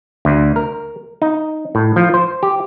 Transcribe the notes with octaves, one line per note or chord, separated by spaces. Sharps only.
D2
A#4
D#4
A2
F3
C5
G4